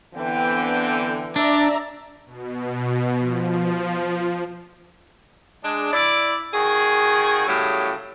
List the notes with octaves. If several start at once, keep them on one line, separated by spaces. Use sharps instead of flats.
D3 E3 B3 C4 G5
D4 D5 E5 A#5
B2
F3
G#3 D4
E4 D5
D#3 F#4 G#4
A2 C#3 F#3 G3 C#4